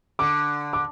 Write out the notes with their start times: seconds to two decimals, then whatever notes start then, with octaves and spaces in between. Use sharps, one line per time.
0.19 D3 D6
0.73 D6